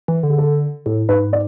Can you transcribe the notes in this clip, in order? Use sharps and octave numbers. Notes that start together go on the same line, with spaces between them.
E3
D3
G#4
A4
A2 A4
G#2 B4
D5